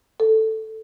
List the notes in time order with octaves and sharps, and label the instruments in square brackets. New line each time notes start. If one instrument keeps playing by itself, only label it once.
[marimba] A4